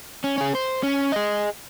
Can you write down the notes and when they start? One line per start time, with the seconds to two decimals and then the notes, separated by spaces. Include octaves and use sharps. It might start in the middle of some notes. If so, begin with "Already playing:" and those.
0.24 C#4
0.38 C#4 G#4
0.55 C5
0.83 C#4
1.12 G#4 D#5